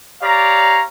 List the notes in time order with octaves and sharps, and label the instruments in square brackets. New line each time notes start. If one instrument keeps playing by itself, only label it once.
[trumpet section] G4 C#5 D5 F5 A#5